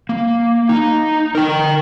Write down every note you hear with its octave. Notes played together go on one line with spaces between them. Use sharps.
A#3
D#4
A#4 G5